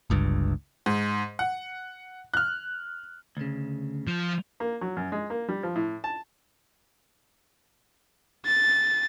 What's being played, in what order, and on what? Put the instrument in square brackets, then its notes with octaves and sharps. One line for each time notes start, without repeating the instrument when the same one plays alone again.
[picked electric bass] G1 C#2 G2
[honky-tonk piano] G#2
F#5
F6 F#6
[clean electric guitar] D2 C#3
[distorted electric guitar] F3
[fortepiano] A#3
F#3
F#2
G#3
A#3
G3
F3
A2
A5
[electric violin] A6